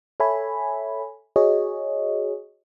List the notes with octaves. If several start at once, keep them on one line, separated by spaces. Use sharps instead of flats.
A4 C#5 E5 G#5 B5
F#4 G#4 C#5 D#5